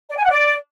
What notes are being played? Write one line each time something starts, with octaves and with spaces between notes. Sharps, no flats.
D5
G#5
F#5
D5